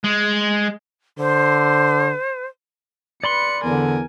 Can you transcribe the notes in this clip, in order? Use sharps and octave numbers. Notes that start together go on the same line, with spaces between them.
G#3
D3 C5
B4 D5 B5 C6 C#7
E2 D3 A#4 G#5